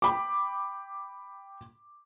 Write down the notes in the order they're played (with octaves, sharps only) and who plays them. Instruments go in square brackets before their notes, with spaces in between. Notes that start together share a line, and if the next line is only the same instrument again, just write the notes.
[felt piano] G5 B5 D6